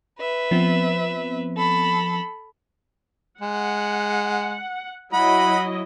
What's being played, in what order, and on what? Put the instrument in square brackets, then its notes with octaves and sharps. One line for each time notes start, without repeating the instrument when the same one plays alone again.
[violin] B4 E5
[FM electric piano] F3 B3 C4
[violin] A4 B5
[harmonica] G#3 [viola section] F#5
[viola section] F#3 E4 D#5 [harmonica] F#5 B5